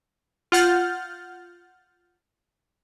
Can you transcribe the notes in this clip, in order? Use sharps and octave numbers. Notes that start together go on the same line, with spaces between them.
F4 F#5 F6 G6 A6